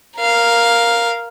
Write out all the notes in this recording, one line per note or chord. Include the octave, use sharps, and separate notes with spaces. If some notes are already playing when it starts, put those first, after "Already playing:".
A#4 F5